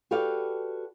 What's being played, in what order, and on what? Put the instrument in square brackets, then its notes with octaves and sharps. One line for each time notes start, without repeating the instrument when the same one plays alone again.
[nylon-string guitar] F#4 G4 A4 B4 D5 F5